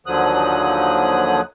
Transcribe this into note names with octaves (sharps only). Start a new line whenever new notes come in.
D#2 D3 F3 F#3 D#6 F#6